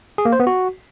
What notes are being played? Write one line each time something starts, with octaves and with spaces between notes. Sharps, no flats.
G#4
A#3
C5
B3
F#4